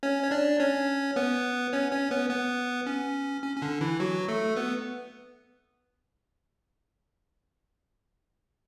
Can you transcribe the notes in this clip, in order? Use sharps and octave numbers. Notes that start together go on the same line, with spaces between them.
C#4 C#5
C#5
D4 D5
C#4 C#5
B3 B4
C#4 C#5
C#4 C#5
B3 B4
B3 B4
C#4
C#4
C#4
D3 D4
E3 E4
F#3 F#4
A3 A4
B3 B4